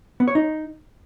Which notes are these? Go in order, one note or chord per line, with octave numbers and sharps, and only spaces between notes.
B3
C#5
D#4